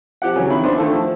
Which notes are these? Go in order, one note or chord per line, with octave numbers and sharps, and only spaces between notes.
F3 G4 F#5
C#3 E3 F#3
D#3 E4 B5
B3 C4 D4 B4 C5 E5
D3 D#3 A3 F4 A4
F3